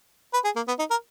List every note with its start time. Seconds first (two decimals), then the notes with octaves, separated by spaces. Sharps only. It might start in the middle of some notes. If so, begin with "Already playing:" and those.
0.33 B4
0.44 G#4
0.56 A#3
0.68 B3
0.79 D#4
0.90 A#4